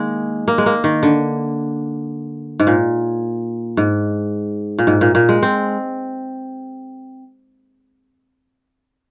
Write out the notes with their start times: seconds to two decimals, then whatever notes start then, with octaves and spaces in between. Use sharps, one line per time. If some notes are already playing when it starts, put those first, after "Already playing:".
Already playing: D#3 G#3 A#3
0.48 A#3
0.58 G#3
0.66 A#3
0.84 D#3
1.03 D3
2.60 G#2
2.67 A#2
3.77 G#2
4.79 A#2
4.87 G#2
5.01 A#2
5.15 A#2
5.29 G#3
5.43 C4